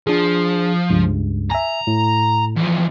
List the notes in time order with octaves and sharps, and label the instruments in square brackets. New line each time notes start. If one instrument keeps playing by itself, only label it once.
[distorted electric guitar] F3 [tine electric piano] D4 G#4
[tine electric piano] C#2 G2
[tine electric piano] E5 G#5 [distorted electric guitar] A#5
[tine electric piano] A2
[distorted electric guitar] E2 F3